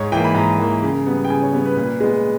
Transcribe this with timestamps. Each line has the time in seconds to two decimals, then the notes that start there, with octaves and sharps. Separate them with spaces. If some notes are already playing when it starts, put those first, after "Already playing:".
Already playing: G#2 C#5
0.12 E3 A#3 G5
0.24 B5
0.35 G#2 A#5
0.58 E3 A#3
0.83 C#3
1.07 G3 B3
1.25 G5
1.30 C#3 G#5
1.42 C#5
1.53 G3 B3 C#5
1.66 B4
1.77 A#2 B4
2.00 G#3 B3